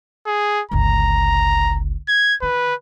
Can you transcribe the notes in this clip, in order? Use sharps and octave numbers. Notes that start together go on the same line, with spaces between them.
G#4
G1 C#2 A#5
G#6
D#3 B4